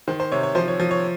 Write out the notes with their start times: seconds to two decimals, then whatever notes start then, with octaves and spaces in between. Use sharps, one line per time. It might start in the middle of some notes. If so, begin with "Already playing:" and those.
0.08 D#3 C5
0.20 C5
0.32 C3 C#5
0.43 C#5
0.55 F3 C5
0.68 C#5
0.80 F3
0.91 C#5